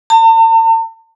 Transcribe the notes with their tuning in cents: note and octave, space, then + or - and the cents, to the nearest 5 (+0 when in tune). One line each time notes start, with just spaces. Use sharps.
A5 +45